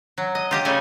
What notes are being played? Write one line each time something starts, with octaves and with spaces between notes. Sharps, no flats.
F#3
D#5
F4 G4 D#5
C#3 G3 A3 D#4 G#5